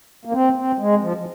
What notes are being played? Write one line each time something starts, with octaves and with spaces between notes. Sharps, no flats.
A#3
C4
C4
G#3
F3
F3